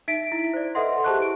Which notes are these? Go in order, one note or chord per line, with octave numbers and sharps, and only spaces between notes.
D#4 E5 B6 D7
E4
C5 D5
A4 B4 D#5 E5 F#5 C6
G4 G#4 C5 A5 C#6 F#6
E4 D7